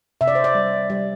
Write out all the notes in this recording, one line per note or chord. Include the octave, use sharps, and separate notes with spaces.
C3 E5
D5
C5
D5
G3
G3